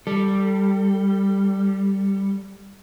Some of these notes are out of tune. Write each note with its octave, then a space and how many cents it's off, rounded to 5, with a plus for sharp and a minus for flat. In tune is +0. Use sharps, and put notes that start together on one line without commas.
G3 +0 A4 +20